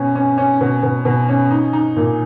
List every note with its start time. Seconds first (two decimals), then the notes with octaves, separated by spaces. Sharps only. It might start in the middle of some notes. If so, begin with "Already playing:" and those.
Already playing: B2 C#4
0.15 C#4
0.38 C#4
0.61 B2
0.83 B2
1.05 B2
1.28 C#4
1.51 D#4
1.73 D#4
1.96 A#2